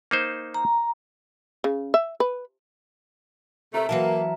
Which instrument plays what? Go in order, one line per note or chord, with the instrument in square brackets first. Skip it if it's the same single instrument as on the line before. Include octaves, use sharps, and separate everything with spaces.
[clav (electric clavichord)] A#3 D#4 C5
[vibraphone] A#5
[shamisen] C#3
E5
B4
[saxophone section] C3 A3 [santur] A#4 E5
[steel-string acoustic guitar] E3 F#3 A5 [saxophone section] A#3